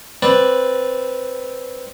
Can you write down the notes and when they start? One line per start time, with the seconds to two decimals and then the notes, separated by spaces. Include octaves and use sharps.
0.23 C4 B4 D5